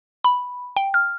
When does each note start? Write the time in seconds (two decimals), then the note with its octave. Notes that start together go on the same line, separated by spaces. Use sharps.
0.24 B5
0.77 G5
0.94 F6